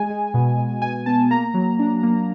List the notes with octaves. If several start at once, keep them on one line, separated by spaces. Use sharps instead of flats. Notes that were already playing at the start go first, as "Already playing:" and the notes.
Already playing: G#3 G#5
G#3
B2
B2
B2 G#5
B3 A5
A#3 A#5
F#3
D4
A#3